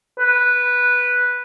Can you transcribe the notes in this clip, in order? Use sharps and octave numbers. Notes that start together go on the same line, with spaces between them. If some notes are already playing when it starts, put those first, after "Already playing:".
B4